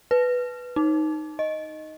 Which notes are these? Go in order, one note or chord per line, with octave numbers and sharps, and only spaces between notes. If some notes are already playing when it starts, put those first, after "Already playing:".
B4
D#4
D#5